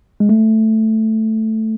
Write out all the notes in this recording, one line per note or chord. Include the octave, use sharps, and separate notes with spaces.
G#3
A3